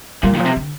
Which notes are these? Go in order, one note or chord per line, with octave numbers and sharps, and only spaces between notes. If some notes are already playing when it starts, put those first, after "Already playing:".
A#2 G3
D#3
A#2 F3
C3
D3